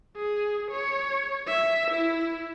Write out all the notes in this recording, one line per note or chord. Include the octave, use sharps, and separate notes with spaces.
G#4
C#5
E5
E4